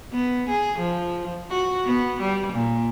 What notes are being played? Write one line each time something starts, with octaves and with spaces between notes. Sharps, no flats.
B3
G#4
F3
F#4
B3
G3
A#2